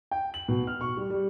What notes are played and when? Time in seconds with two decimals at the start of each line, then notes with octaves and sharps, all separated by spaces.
0.11 G5
0.34 F#7
0.48 B2
0.67 F6
0.81 C#6
0.97 G3
1.10 G3